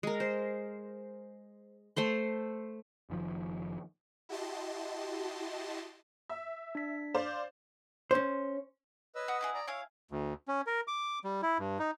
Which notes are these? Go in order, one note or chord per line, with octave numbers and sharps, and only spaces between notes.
G#3 A#4
C5
A3 C5 C6
F#1 D#3 F3
E4 F#4 G4 D#5 A5 C6
E5
D4 B6
C5 D5 F5
C#4 C5
B4 C#5 D#5 E6
F#4 D#6
B3 E4 G#4
D5 A#5
E4 G#4 C#5 F5
D2
C#4
A#4
D6
G3
E4
G2
D#4